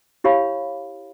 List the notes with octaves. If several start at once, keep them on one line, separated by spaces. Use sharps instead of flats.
E4 G4 C#5 F5 B5